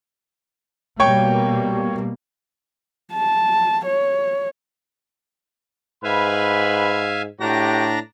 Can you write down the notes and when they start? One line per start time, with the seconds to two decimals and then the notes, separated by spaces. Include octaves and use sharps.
1.00 B2 G3 A#3 C#5 G5 C#6
3.14 A5
3.86 C#5
6.04 G#2 B4 E5 F5 G#5 B5
7.40 A2 D4 F#4 G4 A#5 A#6